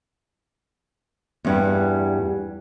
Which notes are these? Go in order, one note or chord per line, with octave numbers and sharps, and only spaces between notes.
E2 G2 G3